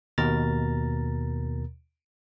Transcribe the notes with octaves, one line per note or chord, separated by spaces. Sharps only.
D#2 B2 A#4 A#5 A6